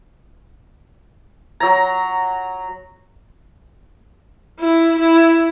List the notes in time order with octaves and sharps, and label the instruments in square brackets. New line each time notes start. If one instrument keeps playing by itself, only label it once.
[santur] F#3 A#5
[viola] E4
E4